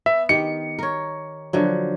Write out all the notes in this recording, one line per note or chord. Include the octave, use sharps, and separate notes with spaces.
B3 E5
D#3 G4 C#7
A#4 C#5
D3 F3 F#3